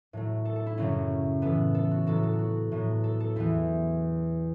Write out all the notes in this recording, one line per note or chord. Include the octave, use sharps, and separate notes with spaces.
A2 F#3 A3
A4
A4
E4
F#2 C#3 F#3 A3 C#4
A2 E3 B3 A4
A4
F#4
A2 F#3 B3 A4
A4
F#4
A2 F#3 B3
A4
A4
E2 E3 B3 E4